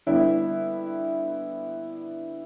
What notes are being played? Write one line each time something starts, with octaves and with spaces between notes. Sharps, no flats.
D3 G3 B3 E4